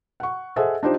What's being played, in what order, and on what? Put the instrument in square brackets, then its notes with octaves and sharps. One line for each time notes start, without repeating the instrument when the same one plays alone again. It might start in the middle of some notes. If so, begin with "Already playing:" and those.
[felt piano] F#5 C#6
G#4 A4 C5 D#5 E5 F#5
D4 D#4 F4 G4 C5 D#5